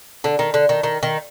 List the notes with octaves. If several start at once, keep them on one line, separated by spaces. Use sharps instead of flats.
D3
D#3
D3
D#3
D#3
D#3